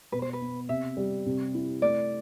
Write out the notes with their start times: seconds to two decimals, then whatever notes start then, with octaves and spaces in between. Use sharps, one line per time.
0.12 B2 B4
0.22 C5
0.33 B4
0.41 B3
0.69 C3 E5
0.97 G3
1.26 C3
1.54 E4
1.82 A3 D5